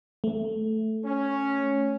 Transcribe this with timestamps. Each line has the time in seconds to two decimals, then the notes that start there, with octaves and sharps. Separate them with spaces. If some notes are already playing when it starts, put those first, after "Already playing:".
0.24 A3
1.05 C#4